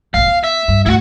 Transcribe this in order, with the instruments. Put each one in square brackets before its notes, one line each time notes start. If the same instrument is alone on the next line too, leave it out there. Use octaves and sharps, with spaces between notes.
[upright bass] E1 A#1 [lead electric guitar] F5
[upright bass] B3
[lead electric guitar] E5
[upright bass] G2
[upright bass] D2 A2 [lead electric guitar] E4 F#4